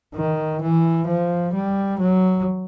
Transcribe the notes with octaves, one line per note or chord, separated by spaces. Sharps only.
D#3
E3
F3
G3
F#3